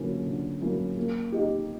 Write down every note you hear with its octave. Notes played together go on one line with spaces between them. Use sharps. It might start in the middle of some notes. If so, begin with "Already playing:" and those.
Already playing: D3 F#3 A#3 C#4 E4
D3
F#3 A#3 C#4 E4
A#3
D#4 G4